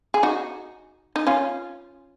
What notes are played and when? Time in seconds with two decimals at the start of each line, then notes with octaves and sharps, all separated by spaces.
0.14 G#4
0.23 D#4 F#4
1.16 D#4
1.27 C#4 F4